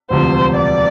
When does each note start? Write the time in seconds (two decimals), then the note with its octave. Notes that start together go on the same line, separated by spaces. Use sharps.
0.10 E1 D2 C3 F3 C5
0.56 D5